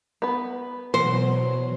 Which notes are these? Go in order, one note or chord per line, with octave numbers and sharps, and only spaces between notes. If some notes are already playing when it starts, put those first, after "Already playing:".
B3 B4
B2 E3 F#3 C5 C6